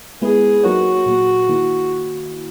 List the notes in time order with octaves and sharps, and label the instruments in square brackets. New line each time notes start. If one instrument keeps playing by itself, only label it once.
[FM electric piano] G#3 B3 E4 B4 [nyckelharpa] G#4
[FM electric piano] F#3 A#3 D#4 A#4 C#5 [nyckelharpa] F#4
[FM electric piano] A#2 F#3 A#3
D#3 A#3 E4